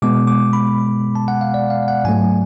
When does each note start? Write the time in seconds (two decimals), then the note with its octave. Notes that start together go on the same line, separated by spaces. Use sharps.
0.02 B2 G#3 B3 D6
0.27 D6
0.53 B5
1.15 A5
1.28 F#5
1.41 F5
1.54 D5
1.70 F5
1.88 F#5
2.04 G#2 F#3 A3 G#5